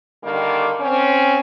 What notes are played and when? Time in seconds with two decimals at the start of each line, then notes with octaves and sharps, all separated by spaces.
0.23 D3 D#3 G3 A#3
0.80 C4 C#4